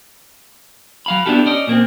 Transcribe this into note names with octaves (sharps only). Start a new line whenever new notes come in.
F#3 F5 B5
B3 D4 E4 F4 G4 A4
C#4 D5 D#5
A#2 A#3 C4